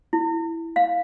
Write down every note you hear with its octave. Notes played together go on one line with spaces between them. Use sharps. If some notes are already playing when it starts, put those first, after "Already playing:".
E4
F5